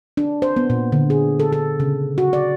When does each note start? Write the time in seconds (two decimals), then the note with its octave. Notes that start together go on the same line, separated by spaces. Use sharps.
0.17 D4
0.42 C5
0.56 B3
0.70 A#2
0.92 D3
1.10 G#4
1.40 A4
1.53 A4
1.80 C#3
2.18 F#4
2.33 D5